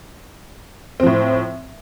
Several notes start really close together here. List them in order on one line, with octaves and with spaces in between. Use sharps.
C4 F3 A2